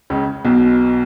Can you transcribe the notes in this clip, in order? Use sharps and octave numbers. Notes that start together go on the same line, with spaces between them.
C#2 C#3
B1 B2